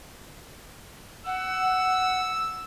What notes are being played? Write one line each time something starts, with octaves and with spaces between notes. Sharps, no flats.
F#5 E6